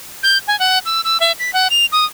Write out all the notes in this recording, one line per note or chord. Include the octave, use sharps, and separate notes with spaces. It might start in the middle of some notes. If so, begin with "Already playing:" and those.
G6
G#5
F#5
E6
E6
E5
B6
F#5
F7
D#6